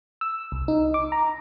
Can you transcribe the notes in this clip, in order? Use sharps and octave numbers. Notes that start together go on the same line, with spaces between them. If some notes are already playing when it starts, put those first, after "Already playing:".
E6
C2
D#4
D6
A#5